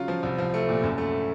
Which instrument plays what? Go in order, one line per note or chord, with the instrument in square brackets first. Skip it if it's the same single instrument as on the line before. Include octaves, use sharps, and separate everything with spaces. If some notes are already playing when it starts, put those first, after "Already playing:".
Already playing: [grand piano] C#3 F#3 F4
F3
C2
F3
A3
A#2
F#2
A3